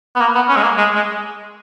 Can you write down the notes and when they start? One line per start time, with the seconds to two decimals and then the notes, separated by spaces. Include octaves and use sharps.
0.16 B3
0.21 A#3
0.35 B3
0.49 C#4
0.56 G#3
0.63 A#3
0.77 G#3
0.95 G#3